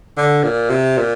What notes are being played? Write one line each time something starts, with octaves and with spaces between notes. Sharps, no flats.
D3
A#2
C3
A#2